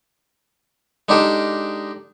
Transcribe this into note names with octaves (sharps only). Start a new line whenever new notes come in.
G#3 D4 D#4 G4 A4